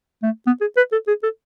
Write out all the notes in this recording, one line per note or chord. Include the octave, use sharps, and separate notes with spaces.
A3
B3
G#4
B4
A4
G#4
A4